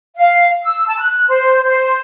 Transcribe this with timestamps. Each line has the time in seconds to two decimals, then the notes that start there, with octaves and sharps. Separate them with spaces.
0.17 F5
0.63 E6
0.87 A5
0.99 F#6
1.29 C5
1.63 C5